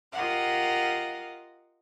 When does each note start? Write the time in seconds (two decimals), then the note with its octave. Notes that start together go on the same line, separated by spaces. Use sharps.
0.13 F4 G4 A#4 D#5 F5 F#5